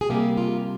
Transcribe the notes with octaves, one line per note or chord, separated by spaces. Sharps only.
G#4
C3 G3 A#3 G4
F4